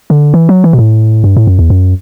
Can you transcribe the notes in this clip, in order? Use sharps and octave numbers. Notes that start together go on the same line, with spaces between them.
D3
E3
F#3
E3
B2
A2
G2
A2
F#2
E2
F#2